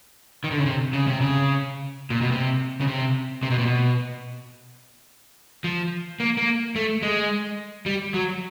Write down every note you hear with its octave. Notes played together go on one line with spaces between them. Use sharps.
D#3
D3
C#3
C3
C#3
C3
C#3
A#2
B2
C3
C#3
C3
C3
B2
A#2
B2
F3
A#3
A#3
A3
G#3
G3
F#3